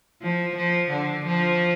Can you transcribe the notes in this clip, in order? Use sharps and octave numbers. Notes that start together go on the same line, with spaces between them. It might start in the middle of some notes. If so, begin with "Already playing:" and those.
F3
F3
D3
F3